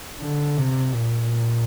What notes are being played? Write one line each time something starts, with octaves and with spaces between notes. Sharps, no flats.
D3
C3
A#2